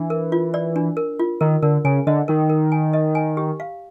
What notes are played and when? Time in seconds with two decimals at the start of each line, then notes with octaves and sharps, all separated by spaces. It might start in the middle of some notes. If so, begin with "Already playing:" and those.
Already playing: E3 D4
0.10 A#4
0.32 F4
0.54 D5
0.76 D4
0.97 A#4
1.19 F4
1.41 D#3 A#4
1.62 D3 A#4
1.84 C#3 G#5
2.07 D3 D#5
2.28 D#3 A#4
2.50 A#4
2.72 G#5
2.93 D#5
3.15 G#5
3.37 G4
3.60 F5